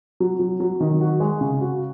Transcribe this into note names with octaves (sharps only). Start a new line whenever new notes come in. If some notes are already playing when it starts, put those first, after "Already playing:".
F#3
F#3
F#3
D#3
F#4
G#3
C#3
F#4